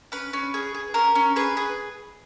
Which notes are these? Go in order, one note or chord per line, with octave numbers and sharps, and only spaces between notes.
C#4 B4
C#4
G#4
G#4
C#4 A#4
C#4
G#4 B4
G#4